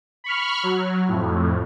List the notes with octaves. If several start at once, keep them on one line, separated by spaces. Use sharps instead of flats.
B5 C#6 F6
F#3
F2 A2